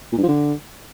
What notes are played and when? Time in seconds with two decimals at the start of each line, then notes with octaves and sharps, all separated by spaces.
0.12 A#2
0.18 G2
0.23 F3
0.29 D3